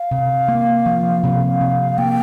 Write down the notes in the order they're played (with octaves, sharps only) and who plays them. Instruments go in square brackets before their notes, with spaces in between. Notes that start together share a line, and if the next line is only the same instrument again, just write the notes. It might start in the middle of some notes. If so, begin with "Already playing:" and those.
Already playing: [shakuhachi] F5
[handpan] C3
A#3
F3
C3
C3
[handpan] A#3 [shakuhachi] G5